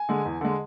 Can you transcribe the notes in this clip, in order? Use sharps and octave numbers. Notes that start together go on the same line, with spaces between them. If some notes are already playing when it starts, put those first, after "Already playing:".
Already playing: G#5
D3 G#3
E2
D3 G#3